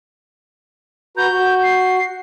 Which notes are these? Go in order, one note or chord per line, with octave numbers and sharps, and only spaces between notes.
F#4 B4 A#5 G6
F#4
C7